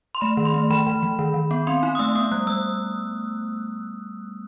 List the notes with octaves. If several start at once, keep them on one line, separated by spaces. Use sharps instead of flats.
C6
A3 B5
D#3
C6
A3
E3 B5
E3
E3
D#3
D#3
B3
C4 C6
D#4
D#6
A3 E6
B3 D#6
G3 F#6
G3 E6